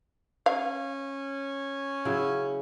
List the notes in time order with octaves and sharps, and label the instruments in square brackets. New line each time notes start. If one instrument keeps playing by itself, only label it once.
[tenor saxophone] C#4 [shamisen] F5
[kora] C#3 F#3 E4